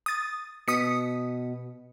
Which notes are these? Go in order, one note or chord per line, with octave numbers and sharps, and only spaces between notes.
D#6 A6
B2 D#6 B6 C#7